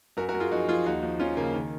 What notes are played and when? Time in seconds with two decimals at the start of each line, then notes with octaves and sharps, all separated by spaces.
0.17 F#2 F#4 A#4
0.29 F#4 A#4
0.34 F#2
0.40 F4 G#4
0.51 F3 D#4 F#4
0.68 F3 F4 G#4
0.86 D#2 D#4 F#4
1.03 F3
1.19 F3 C#4 F4
1.37 C#3 A#3
1.54 D#3